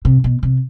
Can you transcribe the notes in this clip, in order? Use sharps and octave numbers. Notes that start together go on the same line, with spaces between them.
C3
B2
C3